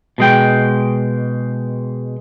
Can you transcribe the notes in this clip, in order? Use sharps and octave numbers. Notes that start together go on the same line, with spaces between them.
B2 G#3 G5